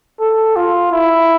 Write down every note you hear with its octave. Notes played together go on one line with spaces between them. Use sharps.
A4
F4
E4